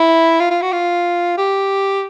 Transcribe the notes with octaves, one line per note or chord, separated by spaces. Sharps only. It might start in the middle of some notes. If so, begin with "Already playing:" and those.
Already playing: E4
F4
F4
F#4
F4
G4